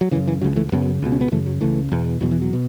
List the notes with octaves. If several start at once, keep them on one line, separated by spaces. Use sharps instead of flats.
F#3
F#2 C#3 E3
E3
C#2 C#3 F#3
E3 A3
F#2 C#3 F#3 B3
C#2 B2
C#4
B3
F#2 C#3 E3 A3
F#3
C#2 C#3 E3 A3
E2 B2
E2 B2 F#3
E3
F#3
B2